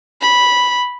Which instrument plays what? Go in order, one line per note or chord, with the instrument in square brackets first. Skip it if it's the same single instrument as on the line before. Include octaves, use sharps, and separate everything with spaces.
[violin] B5